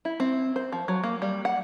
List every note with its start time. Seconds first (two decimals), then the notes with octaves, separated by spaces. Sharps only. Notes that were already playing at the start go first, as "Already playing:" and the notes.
0.05 E4
0.20 C4
0.56 C5
0.72 F3
0.88 F#3
1.04 A#3
1.22 G3
1.45 F#5